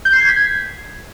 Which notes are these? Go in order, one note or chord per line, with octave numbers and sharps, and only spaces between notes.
G6
C7
G#6
B6
G#6